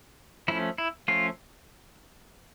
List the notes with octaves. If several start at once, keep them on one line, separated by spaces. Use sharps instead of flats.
F3 A3 C#4 E4
E4
F3 A3 C#4 F4